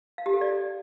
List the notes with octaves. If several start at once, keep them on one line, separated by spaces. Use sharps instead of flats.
F5
G4
A4
D5